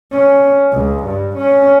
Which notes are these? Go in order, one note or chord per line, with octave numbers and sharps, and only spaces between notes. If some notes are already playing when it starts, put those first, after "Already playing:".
C#4
C#2
G2
C#4